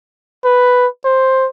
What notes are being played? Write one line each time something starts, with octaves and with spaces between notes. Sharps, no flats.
B4
C5